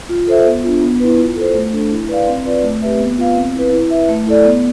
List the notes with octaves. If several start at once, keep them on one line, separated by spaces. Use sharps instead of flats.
F4
A4 C5 E5
B3
D4 F4
B3
E4 B4
F4
A4 C5
A3
D4 A4
E4
B4 D5 F5
C4
F4 B4 D5
A3
C4 G4 B4 E5
B3
F4 B4 F5
C4
E4 B4
E4
B4 E5
A3
E4 A4 D5
B3